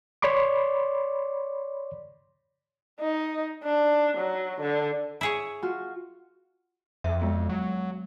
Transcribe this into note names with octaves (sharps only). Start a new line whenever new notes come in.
C#5 D5 B5 C6 D6
D#4
D4
F#3
D3
E4 G#4 C#5
F4 F#4
F2 E5
G#3 B3
F#3